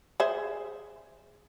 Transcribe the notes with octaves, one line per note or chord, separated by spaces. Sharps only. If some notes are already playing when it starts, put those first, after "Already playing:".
G#4 C5 E5